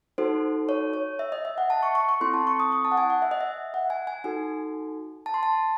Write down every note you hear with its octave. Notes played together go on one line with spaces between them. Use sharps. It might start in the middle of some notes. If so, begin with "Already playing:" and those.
D#4 F#4 A4 C5
C#5
C#5
E5
D#5
E5
F#5
A5
C#6
C#6
C#6
C4 E4 A4 C6
A5
C#6
D#6
C#6
A5
F#5
G#5
F#5
E5
D#5
E5
F#5
G#5
G#5
D#4 F#4 A4 G#5
A5
C6
A5